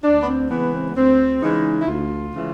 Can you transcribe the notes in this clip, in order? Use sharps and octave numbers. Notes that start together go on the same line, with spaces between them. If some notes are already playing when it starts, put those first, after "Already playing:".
D2 D4
B3
C4
C#3 E3 G#3 B3
C4
B3
D2 C4
C#3 E3 G#3 D#4
E4
D2 F4
C#3 E3 G#3